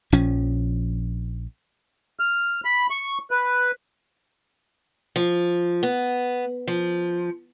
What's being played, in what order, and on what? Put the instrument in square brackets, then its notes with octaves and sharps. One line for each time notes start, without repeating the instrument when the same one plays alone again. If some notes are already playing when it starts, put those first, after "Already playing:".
[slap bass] A#1 F3 C#4
[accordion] F6
B5
C#6
B4
[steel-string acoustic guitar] F3
B3
F3